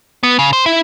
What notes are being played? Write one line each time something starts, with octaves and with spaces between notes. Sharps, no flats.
B3
C#3
C5
E4